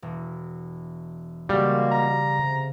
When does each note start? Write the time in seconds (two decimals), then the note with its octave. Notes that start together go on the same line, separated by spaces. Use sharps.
0.02 E1
1.49 C#3 G3 G#3 A#3 F#4 A4 F5
1.92 A#5
2.33 C3